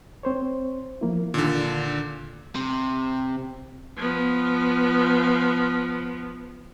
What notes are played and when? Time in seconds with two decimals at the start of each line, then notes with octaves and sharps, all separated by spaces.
0.23 C4 C5 C#5
1.01 F3 A#3 E4
1.34 A#2 D3 D#3 D4
2.55 C3
3.97 F3 B3